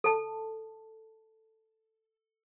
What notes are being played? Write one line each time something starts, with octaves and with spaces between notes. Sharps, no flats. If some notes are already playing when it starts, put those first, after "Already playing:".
A4 A5